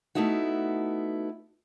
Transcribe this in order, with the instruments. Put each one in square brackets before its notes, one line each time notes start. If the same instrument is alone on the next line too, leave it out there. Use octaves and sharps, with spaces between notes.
[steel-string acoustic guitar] A3 B3 D#4 E4 F#4